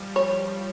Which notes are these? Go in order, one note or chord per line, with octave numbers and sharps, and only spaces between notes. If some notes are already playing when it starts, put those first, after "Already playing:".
Already playing: F3 G3
C#5